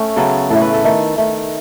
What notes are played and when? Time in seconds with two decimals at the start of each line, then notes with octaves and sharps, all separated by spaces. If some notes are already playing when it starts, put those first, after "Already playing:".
Already playing: A3 C#4
0.16 C#3 F#3 B3 A4
0.50 A2 E3 A3 A4
0.61 B4
0.74 A4
0.84 D#3 A3
1.18 D#3 A3